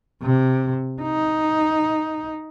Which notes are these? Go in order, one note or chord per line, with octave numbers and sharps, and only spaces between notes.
C3
D#4